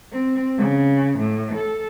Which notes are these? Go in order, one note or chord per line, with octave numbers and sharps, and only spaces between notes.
C4
C#3
A2
A4